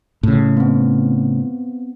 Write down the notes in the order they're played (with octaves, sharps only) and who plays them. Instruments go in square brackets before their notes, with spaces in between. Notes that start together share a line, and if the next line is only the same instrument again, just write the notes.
[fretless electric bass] A2 C#3
[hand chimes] B3 C4